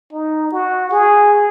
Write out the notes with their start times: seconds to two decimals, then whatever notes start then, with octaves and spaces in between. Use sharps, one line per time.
0.13 D#4
0.52 F#4
0.92 G#4